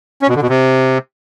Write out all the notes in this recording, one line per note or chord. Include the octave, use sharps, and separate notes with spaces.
C#4
B2
D3
B2
C3